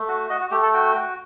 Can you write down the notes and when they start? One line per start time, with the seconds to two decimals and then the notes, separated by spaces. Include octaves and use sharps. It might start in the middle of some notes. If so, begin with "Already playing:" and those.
Already playing: A3
0.08 F#4
0.30 F#4 D#5
0.41 F#4
0.51 A3 G4
0.63 A4
0.74 F#4 G5
0.96 F#4